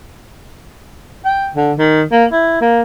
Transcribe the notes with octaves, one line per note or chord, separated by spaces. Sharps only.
G5
D3
D#3
A#3
E4
A#3